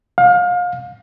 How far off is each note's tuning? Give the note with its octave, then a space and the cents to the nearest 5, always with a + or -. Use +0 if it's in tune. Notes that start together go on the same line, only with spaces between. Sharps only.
F5 +30